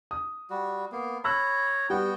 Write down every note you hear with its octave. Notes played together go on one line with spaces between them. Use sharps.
D#6
G3 F#4
A#3 B3
C#5 A#5 B5 E6 F#6
G3 B3 F#4 G5